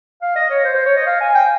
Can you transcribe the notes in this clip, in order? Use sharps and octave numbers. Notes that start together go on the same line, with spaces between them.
F5
D#5
C#5
C5
C5
C#5
D#5
F5
G#5
G5